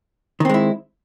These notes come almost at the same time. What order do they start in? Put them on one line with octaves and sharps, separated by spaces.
D#3 C4 G#3 E4